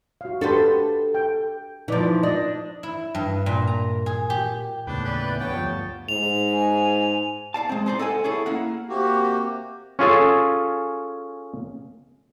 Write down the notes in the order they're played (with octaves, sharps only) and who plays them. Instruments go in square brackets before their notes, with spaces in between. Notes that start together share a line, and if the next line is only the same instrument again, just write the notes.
[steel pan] F#4 F5
[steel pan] D4 G4 F#5 [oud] A4 B4 C5
[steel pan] G5
[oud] E3 F3 [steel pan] D#4 D5 D6
[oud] D4 [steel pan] D#5
[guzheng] E4
G2
A#2
A#5
G#4
G4
[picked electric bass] D#2 A2 C#3 [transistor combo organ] B3 G5 [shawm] D4
[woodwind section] E3 D5 [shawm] B4
[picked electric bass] G2 [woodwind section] B3 C#5 [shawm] G5 [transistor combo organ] A5
[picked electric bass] D2 G2 F3
[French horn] G#2 [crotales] F7
[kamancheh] G#5
[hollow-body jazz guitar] D5 F5 A5
G#3 C4
D#4 C5 D5
A4 D#5 F#5 G#5
C#4 E4 G#4 A4
A#3 E4 F5 F#5
[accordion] C3 A#3 F#4 G4
[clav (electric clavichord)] C#4 F4 G#4 A4